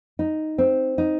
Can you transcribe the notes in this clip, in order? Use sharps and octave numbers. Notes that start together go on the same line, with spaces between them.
D#4
C4
D#4